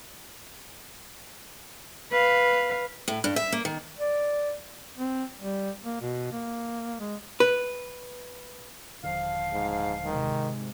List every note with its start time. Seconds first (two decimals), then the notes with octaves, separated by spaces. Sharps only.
2.11 B4 F5
3.08 A2
3.24 G2
3.36 E5
3.52 A#3
3.65 D#3
3.99 D5
4.98 C4
5.41 G3
5.84 A#3
6.01 B2
6.32 A#3
7.00 G#3
7.40 B4
9.03 D#1 D3 F3 F5
9.53 G#2
10.05 G#2 C3 D#3